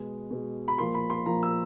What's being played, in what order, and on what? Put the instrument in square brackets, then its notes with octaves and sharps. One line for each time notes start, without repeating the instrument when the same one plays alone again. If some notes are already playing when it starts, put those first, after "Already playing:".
Already playing: [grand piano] B2 G#3 B3
B2 G#3 B3
B5
A#2 F3 A#3 C6
B5
C6
A#2 F3 A#3 A#5
E6